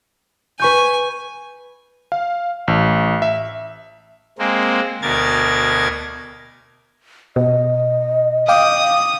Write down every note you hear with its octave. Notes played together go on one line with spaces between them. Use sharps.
B4 G#5 C#6 G6
F5
A1
E5
G#3 A#3 C4
D2 B2 A#4 G#6 A6
B2 D#5
F5 G5 D6 D#6